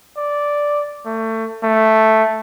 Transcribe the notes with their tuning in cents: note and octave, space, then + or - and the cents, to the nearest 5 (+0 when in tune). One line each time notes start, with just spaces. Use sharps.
D5 -5
A3 +25
A3 +0